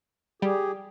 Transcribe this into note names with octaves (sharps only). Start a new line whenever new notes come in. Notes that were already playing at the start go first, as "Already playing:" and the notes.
G3 G4 G#4